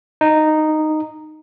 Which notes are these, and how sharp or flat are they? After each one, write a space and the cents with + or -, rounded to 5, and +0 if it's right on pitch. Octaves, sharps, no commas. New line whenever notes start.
D#4 -10